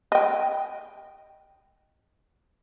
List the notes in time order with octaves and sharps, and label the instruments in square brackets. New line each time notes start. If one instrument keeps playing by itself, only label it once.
[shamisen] D#5 G5